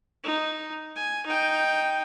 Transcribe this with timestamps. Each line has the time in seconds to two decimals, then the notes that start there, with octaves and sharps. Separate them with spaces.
0.24 D#4
0.96 G#5
1.26 D#4 G5